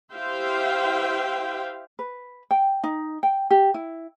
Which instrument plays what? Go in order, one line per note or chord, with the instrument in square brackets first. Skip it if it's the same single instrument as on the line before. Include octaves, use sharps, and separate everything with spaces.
[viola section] E4 G4 C5 E5 F5 G5
[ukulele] B4
G5
D#4
G5
G4
E4